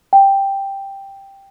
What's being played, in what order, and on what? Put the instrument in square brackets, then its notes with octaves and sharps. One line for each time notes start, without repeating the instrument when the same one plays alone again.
[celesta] G5